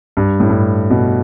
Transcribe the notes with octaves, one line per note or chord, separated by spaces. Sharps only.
G2
A2
G2
B2